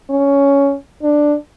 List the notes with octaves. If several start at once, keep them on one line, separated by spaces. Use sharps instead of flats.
C#4
D4